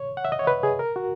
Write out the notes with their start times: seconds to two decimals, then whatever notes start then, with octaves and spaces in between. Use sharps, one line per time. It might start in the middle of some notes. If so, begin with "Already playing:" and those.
Already playing: C#5
0.17 F#5
0.25 E5
0.32 D#5
0.39 C#5
0.47 B4
0.63 G#4
0.79 A#4
0.96 F#4